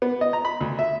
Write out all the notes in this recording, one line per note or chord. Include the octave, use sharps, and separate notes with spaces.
B3
D#5
A#5
B5
D2
E5